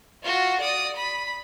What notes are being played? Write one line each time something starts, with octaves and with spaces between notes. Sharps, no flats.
F4 F#4
D5 D#6
B5